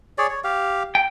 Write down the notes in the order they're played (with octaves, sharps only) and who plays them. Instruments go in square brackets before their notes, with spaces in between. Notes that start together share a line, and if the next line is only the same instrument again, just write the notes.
[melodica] G#4 C#5 D5
C#5
G4 F5
[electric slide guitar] G5